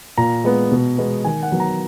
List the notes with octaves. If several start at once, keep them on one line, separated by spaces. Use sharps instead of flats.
A#2 A#5
G#3 B3
B2
G#3 B3
D#3 G#5
F#5
F#3 B3
A#5